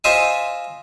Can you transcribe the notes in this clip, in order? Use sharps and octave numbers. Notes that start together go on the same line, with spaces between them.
F4 C5 D#5 E5 G#5